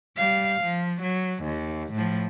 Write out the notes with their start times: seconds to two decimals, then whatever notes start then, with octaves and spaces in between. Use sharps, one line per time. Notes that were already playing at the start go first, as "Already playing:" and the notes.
0.16 G3 F5
0.61 F3
1.02 F#3
1.44 D#2
1.93 A2 F3